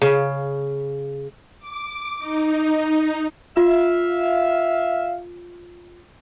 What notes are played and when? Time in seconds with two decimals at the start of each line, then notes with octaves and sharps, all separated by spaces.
0.02 C#3
1.59 D6
2.18 D#4
3.57 F4 E5 F5